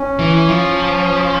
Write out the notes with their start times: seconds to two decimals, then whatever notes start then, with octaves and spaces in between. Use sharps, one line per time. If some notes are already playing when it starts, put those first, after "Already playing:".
Already playing: C#4
0.19 E3
0.49 F3